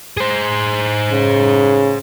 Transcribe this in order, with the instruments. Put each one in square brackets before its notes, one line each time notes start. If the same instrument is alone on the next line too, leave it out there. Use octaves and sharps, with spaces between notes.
[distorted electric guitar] G#4 C5
[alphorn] C#3